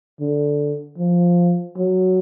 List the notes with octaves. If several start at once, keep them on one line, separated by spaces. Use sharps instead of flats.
D3
F3
F#3